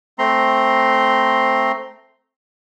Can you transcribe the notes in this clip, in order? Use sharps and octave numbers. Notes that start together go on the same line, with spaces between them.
A3 C4 A#5 C6